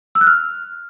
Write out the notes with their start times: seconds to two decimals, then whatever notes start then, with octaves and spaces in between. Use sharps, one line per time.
0.15 E6
0.21 F#6
0.27 F6